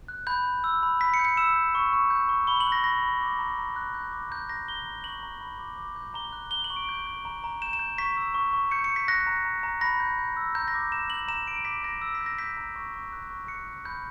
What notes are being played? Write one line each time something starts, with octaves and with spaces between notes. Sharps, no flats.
F#6
B5 G6
G6
E6
B5
B5 B6
C#7
G6
C#7
E6 E7
G6
C#6
C#6
G6
C#6
B5 G7
F#7
F#6
A#6
B5 A#6
B5
D6
A#5
A#5
F#6
G6
D6
A#5 G6
A#5 A#6
A#5 G7
A#5
C#6 F#7
A#5
B5
D6
D6
G6
A#5 G7
F#6
A#5 G7
F#7
C#6
D7
G6
G6
A#5
A#5
G6 E7
E7
G6
C#6 B6
E6
C#6
C#6
G6 C#7
C#7
G6
B6
F#6 A#6
A#5
A#5
A#5
B5 A#6
G6
G6
E6
A#5 G6
A#6
D6
A#5 E7
G6 F#7
A#5 E7
A#5 D7
D6 B6
A#5 A#6
E6
B6
G6
A#6
G6 B6
A#5
C#6
C#6
F#6
C#6
F#6 C#7
F#6
B5 G6